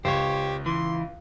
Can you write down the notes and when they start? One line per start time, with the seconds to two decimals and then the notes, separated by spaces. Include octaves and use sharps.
0.05 C#2 G4 C5 C#5
0.66 E3 C6